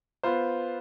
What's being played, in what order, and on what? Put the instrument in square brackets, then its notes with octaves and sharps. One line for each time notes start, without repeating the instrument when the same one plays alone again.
[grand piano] B3 F4 C5